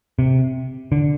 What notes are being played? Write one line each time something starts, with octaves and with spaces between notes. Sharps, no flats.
C3
D3